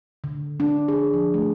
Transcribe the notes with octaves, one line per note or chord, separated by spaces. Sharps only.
D3
D4
G#4
F3
A3